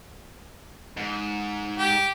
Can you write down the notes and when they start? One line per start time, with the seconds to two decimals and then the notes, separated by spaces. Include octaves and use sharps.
0.97 G#2
1.78 G4